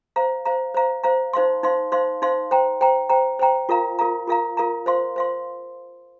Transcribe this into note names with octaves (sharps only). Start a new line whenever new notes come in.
C5 F5 A#5
C5 F5 A#5
C5 F5 A#5
C5 F5 A#5
D#4 C5 F5 C6
D#4 C5 F5 C6
D#4 C5 F5 C6
D#4 C5 F5 C6
C5 G5 A#5
C5 G5 A#5
C5 G5 A#5
C5 G5 A#5
F4 A#4 F5 A#5
F4 A#4 F5 A#5
F4 A#4 F5 A#5
F4 A#4 F5 A#5
C5 F5 C6
C5 F5 C6